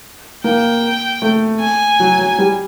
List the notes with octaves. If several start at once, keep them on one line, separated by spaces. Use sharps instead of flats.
A#3 G5
A3
G#5
F#3
F#3
G3